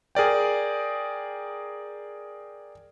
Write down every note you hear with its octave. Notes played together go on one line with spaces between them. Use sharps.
G#4 A#4 D5 G5